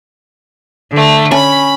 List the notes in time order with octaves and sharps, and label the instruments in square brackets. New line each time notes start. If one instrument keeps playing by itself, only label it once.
[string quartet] D3 A3
[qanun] C#4 [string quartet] B5